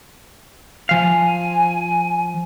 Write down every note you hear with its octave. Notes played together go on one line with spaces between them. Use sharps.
F3 F5 G#5